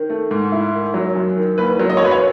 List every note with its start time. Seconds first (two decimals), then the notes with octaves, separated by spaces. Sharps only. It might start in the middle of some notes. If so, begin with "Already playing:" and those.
Already playing: D#3
0.10 A3
0.31 G#2
0.52 E4
0.73 D#3
0.94 F#3
1.15 F#2
1.37 D#3
1.58 F#1 B4
1.79 F#3
1.90 D#5
1.97 C#5
2.01 F#2 B4
2.11 C#5